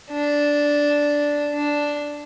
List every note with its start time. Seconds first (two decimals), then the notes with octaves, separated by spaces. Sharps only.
0.11 D4
1.54 D4